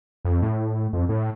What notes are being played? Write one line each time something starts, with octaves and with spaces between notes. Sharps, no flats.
F2
A2
F2
A2